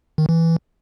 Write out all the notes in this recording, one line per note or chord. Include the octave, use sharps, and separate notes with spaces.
D#3
E3
E3